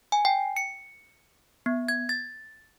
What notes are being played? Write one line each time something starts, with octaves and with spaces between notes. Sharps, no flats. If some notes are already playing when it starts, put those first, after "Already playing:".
G#5
G5
C#7
B3
G#6
A6